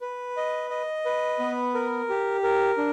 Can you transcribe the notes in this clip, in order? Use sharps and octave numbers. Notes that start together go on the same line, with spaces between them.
B4
D#5
D#5
B4
B3
A#4
G4
A#4
D4